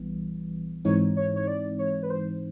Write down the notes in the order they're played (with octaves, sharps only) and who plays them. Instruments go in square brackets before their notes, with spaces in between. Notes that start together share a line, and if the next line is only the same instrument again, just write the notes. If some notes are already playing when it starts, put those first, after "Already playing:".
Already playing: [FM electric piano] A#1 E3 G3 B3
[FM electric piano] G#2 E3 G#3 C4 D#4 [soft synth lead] C#5
[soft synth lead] C#5
C#5
D5
C#5
B4
C5